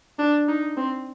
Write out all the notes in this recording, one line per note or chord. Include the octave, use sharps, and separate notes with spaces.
D4
D#4
C4